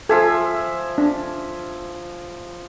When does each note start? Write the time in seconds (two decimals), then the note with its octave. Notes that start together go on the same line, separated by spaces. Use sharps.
0.09 F3 A4 E5 G#5
0.98 D4